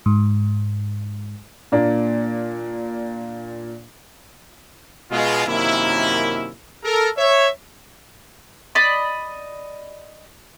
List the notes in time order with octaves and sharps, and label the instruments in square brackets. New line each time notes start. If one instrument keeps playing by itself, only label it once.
[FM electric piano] G#2
[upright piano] A#2 A#3 D4
[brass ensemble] B2 G#3 F4
F#2 C3 D#3 A#3 C#4 E4
A4 A#4
C#5 E5
[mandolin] D5 D#5 B5